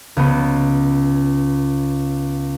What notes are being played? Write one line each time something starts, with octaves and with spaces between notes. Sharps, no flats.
C#2 B3